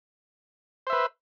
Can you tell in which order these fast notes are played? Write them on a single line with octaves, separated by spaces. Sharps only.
C5 E5 B4